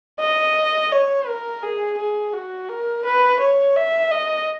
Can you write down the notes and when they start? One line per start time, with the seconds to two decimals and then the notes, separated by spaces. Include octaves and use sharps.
0.20 D#5
0.92 C#5
1.28 A#4
1.63 G#4
1.98 G#4
2.33 F#4
2.69 A#4
3.05 B4
3.39 C#5
3.76 E5
4.11 D#5